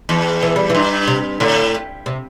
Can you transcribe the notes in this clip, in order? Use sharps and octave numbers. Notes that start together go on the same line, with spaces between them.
E2
E3
G3
G2 E3
C3
A2 D3
C3